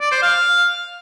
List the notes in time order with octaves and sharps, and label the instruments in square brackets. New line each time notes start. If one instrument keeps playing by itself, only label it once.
[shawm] D5
C5
F5